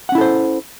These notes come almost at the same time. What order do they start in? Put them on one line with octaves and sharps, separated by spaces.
F#5 C#4 E4 A4 C5